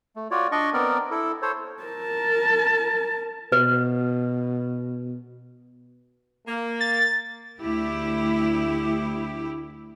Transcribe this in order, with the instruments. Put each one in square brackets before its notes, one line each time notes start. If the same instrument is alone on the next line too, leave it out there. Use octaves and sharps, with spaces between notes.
[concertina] A3
F4 F#4 C#5 D5
D4 D5 D#5 C#6
B3 C4 A#4 D5
E4 A4
A4 C5 C#5
[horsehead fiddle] A#4 A5
[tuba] B2 [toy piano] B4
[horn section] A#3
[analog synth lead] A6
[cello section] D2 E4 G4